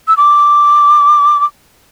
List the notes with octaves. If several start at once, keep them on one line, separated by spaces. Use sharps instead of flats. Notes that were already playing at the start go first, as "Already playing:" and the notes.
E6
D6
D6